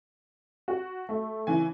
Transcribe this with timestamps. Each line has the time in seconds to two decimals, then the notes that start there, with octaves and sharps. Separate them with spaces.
0.68 F#4
1.09 A3
1.47 C#3 E3 G#5